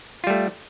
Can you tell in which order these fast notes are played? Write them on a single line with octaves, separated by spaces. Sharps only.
F4 G3 A3